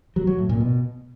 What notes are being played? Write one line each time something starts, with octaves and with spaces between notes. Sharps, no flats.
F#3
F#3
A2
A#2
B2